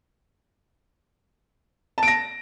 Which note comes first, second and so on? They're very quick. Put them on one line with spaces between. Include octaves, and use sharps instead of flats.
A5 D7 A#6